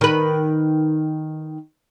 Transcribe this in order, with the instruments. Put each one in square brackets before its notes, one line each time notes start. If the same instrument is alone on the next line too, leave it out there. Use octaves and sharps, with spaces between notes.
[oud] D#3 B4